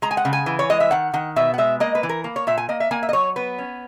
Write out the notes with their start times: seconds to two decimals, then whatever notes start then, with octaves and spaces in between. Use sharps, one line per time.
0.02 G#3 A#5
0.11 G#5
0.17 F#5
0.25 C#3
0.33 G#5
0.46 E3
0.59 C#5
0.70 G#3 D#5
0.80 E5
0.91 D#3 F#5
1.14 D#3 F#5
1.36 B2 E5
1.54 F#5
1.58 G#3 E5
1.80 A#3 D#5
1.95 B4
2.03 E3
2.09 A#4
2.24 A#3
2.36 C#5
2.47 A#2 E5
2.58 G#5
2.69 A#3 D#5
2.80 E5
2.91 A#3 G#5
3.03 E5
3.09 D#5
3.13 F#3 C#5
3.36 B3 B4
3.58 C#4